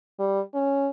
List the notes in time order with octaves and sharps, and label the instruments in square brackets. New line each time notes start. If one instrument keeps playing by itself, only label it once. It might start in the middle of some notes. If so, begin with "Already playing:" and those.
[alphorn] G3
C#4